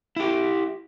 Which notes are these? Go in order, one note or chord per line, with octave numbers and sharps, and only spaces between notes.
E4 G4